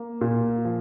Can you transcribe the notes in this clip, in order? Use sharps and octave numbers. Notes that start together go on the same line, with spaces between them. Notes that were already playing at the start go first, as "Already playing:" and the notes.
Already playing: A#3
A#2
F3